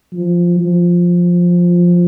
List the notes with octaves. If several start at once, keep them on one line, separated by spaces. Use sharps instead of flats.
F3
F3